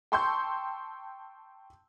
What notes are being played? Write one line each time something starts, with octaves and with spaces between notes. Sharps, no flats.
G5 A5 C6 C#6 E6 G6